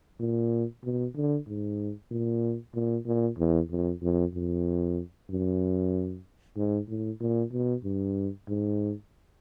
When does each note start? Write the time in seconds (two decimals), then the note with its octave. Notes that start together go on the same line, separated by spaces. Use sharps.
0.20 A#2
0.84 B2
1.16 D3
1.48 G#2
2.11 A#2
2.75 A#2
3.07 A#2
3.38 E2
3.70 F2
4.02 F2
4.34 F2
5.30 F#2
6.57 G#2
6.89 A2
7.21 A#2
7.53 B2
7.84 G2
8.48 G#2